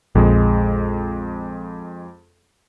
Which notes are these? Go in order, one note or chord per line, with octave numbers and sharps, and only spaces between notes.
A#1 F2 G#3